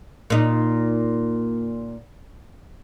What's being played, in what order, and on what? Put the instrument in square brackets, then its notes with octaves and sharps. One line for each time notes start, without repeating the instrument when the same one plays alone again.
[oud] A#2 D#4